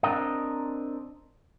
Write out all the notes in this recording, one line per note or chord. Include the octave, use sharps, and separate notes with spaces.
C4 D4 A#4 D#5